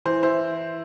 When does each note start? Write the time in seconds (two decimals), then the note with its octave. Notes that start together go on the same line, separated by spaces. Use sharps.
0.05 E3 C5
0.23 E4 C5